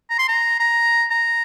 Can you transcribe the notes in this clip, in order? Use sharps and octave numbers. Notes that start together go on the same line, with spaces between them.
A#5
C6
A#5
A#5
A#5